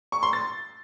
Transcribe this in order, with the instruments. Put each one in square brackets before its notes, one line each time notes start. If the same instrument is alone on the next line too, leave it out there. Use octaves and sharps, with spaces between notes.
[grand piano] C#6
C6
A6